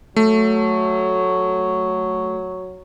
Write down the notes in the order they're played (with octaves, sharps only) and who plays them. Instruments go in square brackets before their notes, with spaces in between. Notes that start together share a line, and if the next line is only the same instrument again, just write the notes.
[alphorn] F#3 [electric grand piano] A3